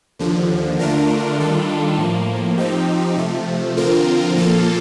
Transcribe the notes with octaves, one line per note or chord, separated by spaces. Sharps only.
D#2 D3 F3
D3 A3 D4 F4 A#4
D#3 G3 D4 F4 A4
A2 F3 A#3
F3 C4 D#4 G4
C3 F3 A3
D3 F3 C4 F4 A#4
A#2 F3 A#3 F4 A4